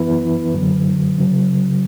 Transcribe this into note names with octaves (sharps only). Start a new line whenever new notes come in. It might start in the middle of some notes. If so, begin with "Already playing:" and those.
Already playing: F#2 E3 B3 E4 B4
F#2 D3 F#3
C#3 F#3